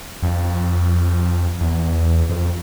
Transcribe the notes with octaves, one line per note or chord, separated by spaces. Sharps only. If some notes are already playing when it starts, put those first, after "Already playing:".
F2
E2
F2